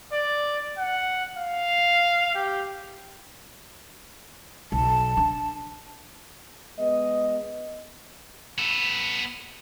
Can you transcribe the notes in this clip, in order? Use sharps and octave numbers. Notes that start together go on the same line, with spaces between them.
D5
F#5
F5
G4
B1 A5
D4
G#3 B3 D#5
B3 A4